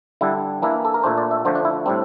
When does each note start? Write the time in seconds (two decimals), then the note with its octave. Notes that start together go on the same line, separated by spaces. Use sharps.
0.21 D3 G3 D4 E4
0.62 E3 A#3 D4 E4
0.85 A4
0.94 A#4
1.03 A#2 A3 D4 C5
1.18 D5
1.31 E5
1.45 D3 F3 A3 D4 C5
1.55 D4
1.65 E4
1.86 A2 G3 C4 D4